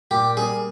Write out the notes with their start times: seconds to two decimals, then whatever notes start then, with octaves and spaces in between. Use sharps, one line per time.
0.11 A#2 G4
0.37 G3 A#3 G#4